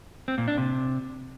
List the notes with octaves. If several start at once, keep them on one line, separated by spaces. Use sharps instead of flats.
C4
A#2
D4
C3